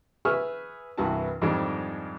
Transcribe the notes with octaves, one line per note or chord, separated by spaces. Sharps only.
G#4 B4 E5 C#6 E6 F6
C2 G2 E3 F#4 B4 A5
F2 G#2 D#3 G3 G#3 D4